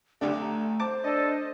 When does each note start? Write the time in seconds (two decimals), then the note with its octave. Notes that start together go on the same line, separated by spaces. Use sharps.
0.21 B1 D3 A3 D4 G4
0.40 A#5
0.80 C5 A5 D6
1.04 D4 A4 D#5